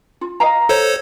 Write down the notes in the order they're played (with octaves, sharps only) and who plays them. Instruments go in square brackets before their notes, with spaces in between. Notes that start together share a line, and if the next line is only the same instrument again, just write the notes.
[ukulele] F4
D#5 F5 A#5
[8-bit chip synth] A4 C5 C#5